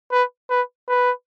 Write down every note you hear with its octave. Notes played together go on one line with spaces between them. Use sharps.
B4
B4
B4